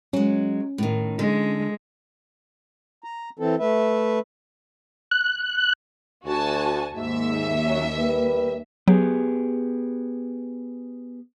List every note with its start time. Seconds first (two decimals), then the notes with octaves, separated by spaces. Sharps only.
0.13 F#3 G#3 C#4
0.78 A2 D#3
1.19 D3 G#3
3.04 A#5
3.39 E3 C4 A4
3.59 A3 B4 E5
5.11 F#6
6.26 D2 F#4 G#5 A5
6.95 D#2 G#2 E5
7.65 F#3 A#3 C#4
7.97 G3 A#4 B4
8.88 F#3 B3 G4 G#4